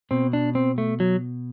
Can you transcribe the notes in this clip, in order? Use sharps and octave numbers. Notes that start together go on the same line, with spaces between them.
B2 C4
D4
C4
A3
F#3